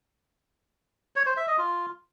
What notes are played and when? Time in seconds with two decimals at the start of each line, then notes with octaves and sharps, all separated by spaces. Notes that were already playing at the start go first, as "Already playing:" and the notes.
1.16 C#5
1.26 C5
1.37 E5
1.47 D#5
1.58 F4